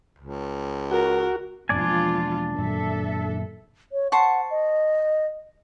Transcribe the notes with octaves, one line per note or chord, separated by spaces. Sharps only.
C#2
F#4 A#4
E1 E2 F3 A#3 D4 F4 D5 G#5
F#2 A#2 D#3 A4 E5
C#5
C5 F#5 A5 C#6
D#5